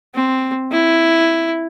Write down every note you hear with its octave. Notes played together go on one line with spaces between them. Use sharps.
C4
E4